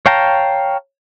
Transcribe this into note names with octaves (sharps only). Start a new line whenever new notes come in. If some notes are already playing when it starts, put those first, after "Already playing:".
C#5 F5 G5 A5 A#5